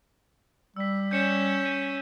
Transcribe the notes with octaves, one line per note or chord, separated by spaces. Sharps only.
G3 E6 B6
C#4 G6 C#7 E7
D#7